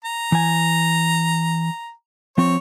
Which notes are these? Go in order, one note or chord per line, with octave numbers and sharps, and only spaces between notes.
A#5
E3 G#5
F3 C4 C#5